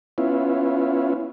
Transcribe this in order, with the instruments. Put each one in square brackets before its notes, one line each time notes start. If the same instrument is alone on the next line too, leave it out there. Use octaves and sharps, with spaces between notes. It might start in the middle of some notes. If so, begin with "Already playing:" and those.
[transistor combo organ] B3 C#4 E4 F4